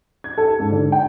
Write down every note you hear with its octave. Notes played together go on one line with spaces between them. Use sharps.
G#6
A4
G#2
D3
G5